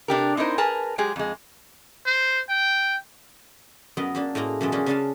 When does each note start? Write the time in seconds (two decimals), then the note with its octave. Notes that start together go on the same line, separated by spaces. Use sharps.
0.08 C3 D4 G4 A#4
0.37 C4 D#4 E4 A#4 C5
0.58 G#4 A#4 B4 G#5 A5
0.98 F#3 G#3 G4 G#4
1.16 F2 G#3
2.06 C5
2.49 G5
3.97 F#2 B3 A#4 D#5
4.15 F#2 A#3 D4
4.35 A2 G#3 A#3 A#5
4.61 F#2 B2 E3 G#3 A5
4.72 G#3 A#3 C#4 D4
4.86 C#3 C#4 D4 F5 G#5 A5